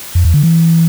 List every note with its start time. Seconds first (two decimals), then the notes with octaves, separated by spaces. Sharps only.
0.15 F2
0.25 E2
0.34 D3
0.43 E3